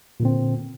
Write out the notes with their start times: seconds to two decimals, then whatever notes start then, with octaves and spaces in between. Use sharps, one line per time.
0.20 A#2
0.22 D3
0.25 C4